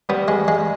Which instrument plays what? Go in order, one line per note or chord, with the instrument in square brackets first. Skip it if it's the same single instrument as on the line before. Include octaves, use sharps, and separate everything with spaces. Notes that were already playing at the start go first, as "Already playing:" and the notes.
[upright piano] G3 [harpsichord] B3
[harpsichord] G#3
G#3